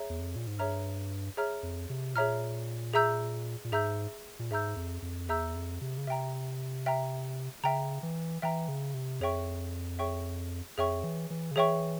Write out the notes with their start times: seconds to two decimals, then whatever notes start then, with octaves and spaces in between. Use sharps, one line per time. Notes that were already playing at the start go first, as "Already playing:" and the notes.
Already playing: G#4 C#5 E5 A#5
0.10 E2
0.19 F2
0.36 A#2
0.47 G#2
0.59 G2 G#4 C#5 E5 A#5 F6
1.37 G#4 C#5 E5 A#5 F6
1.63 F2
1.90 C3
2.15 A#2 G#4 C#5 E5 A#5 F6
2.94 G#4 E5 A#5 E6 G6
3.65 A#2
3.72 G#2 G#4 E5 A#5 E6 G6
4.39 A#2
4.51 G#2 G#4 E5 A#5 E6 G6
4.76 F2
5.02 F2
5.28 E2 G#4 E5 A#5 E6 G6
5.55 F2
5.81 C3
5.98 C#3
6.07 C3 E5 G5 A#5
6.86 E5 G5 A#5
7.63 C#3 E5 G5 A#5
8.03 E3
8.42 E3 E5 G5 A#5
8.68 C#3
8.94 C3
9.21 F2 G#4 C#5 E5 G5 C#6
9.99 G#4 C#5 E5 G5 C#6
10.78 F2 G#4 C#5 E5 G5 C#6
11.04 E3
11.30 E3
11.51 C#3
11.56 E3 G#4 C#5 E5 G5 C#6